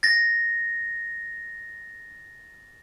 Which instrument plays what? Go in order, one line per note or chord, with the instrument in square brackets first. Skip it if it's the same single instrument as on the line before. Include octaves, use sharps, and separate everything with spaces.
[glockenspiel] A6 A#6